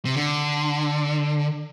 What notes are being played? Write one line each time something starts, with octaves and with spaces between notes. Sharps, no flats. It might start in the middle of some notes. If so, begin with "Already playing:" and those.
C3
D3